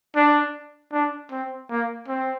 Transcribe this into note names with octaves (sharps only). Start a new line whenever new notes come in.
D4
D4
C4
A#3
C4